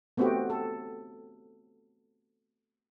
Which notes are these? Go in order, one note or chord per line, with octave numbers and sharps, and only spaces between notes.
A3 B3 C4 D#4 F#4 G4
A4